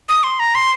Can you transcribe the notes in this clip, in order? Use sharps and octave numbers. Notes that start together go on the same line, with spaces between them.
D#6
C6
A#5
C6